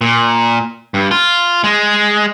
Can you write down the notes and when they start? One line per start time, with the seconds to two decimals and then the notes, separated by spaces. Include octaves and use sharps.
0.01 A#2
0.94 G2
1.11 F4
1.64 G#3